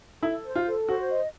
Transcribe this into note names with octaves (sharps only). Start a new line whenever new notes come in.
E4 A4
C5
F4
A4
F#4 C5
D#5